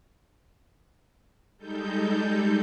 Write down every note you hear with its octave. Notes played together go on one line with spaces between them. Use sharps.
G3 G#3 D#4 A4 G6